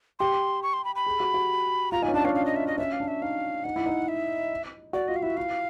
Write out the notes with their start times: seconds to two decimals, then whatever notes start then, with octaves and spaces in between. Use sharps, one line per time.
0.19 G4 C6
0.63 C#6
0.73 C6
0.85 B5
0.95 B5
1.07 G#4
1.20 F#4
1.34 F#4
1.92 F4 A#5
2.02 D#4 G#5
2.08 C#4
2.14 D4 A5
2.25 C#4 F5
2.35 F5
2.46 D#5
2.56 E5
2.67 D#5
2.78 C#4 E5
2.93 F5
3.00 D4
3.08 E5
3.22 D#4 F5
3.64 D#4 F#5
3.76 E4
3.86 D#4
4.08 E5
4.93 F#4 D5
5.08 F4 D#5
5.16 F5
5.23 E4 E5
5.37 E4 F5